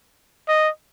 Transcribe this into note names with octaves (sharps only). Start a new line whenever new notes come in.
D#5